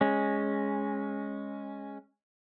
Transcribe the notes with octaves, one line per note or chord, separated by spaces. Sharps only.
G#3 C#4